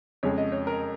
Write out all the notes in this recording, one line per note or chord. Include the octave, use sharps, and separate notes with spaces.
F2 C#3 G#3 C#5
D#5
C#5
A#4